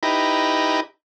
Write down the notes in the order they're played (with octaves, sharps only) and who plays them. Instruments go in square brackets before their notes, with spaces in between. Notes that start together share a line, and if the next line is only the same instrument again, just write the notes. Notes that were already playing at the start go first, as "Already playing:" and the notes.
[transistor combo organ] D#4 E4 G4 B4 A#5